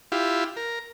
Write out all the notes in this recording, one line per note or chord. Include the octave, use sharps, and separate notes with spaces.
E4 F4 G4
A#4